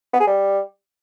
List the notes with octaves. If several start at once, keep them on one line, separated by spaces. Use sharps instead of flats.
B3
G#4
G3